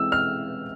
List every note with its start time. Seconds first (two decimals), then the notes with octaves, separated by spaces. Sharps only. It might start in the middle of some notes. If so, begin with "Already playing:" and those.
Already playing: E3 G#3 C4 E6
0.12 F6